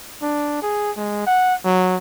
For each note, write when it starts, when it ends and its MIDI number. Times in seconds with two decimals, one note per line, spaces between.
0.22 0.59 62
0.62 0.91 68
0.97 1.26 56
1.27 1.55 78
1.65 1.97 54